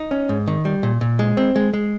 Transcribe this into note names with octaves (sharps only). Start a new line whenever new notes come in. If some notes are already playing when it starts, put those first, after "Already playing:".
Already playing: D#4
C#4
G#2
D#3
G3
A#2
A#2
G#3
C4
G#3
G#3